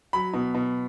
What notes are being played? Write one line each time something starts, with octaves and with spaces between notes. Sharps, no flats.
F#3 B5
B2
B2